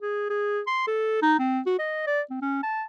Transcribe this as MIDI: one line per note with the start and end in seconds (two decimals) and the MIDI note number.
0.02 0.27 68
0.30 0.61 68
0.67 0.85 84
0.88 1.17 69
1.22 1.34 63
1.39 1.60 60
1.66 1.77 66
1.79 2.04 75
2.07 2.21 74
2.30 2.38 60
2.42 2.61 61
2.63 2.84 81